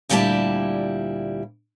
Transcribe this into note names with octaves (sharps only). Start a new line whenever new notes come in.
D2 A#2 G3 E4 G4 A5